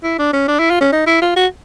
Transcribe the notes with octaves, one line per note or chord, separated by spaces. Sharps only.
E4
D4
C#4
D4
E4
F4
C#4
D#4
E4
F4
F#4